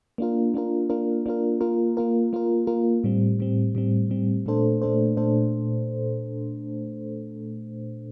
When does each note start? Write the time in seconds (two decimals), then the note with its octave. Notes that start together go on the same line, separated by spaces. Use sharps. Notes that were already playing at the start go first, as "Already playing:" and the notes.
0.18 A#3 D4 F4 A#4
0.54 A#3 D4 F4 A#4
0.90 A#3 D4 F4 A#4
1.26 A#3 D4 F4 A#4
1.61 A#3 F4 A#4
1.97 A#3 F4 A#4
2.33 A#3 F4 A#4
2.67 A#3 F4 A#4
3.04 A2 G3 C4
3.39 A2 G3 C4
3.75 A2 G3 C4
4.10 A2 G3 C4
4.46 A#2 A3 D4 A4 C5
4.82 A#2 A3 D4 A4 C5
5.17 A#2 A3 D4 A4 C5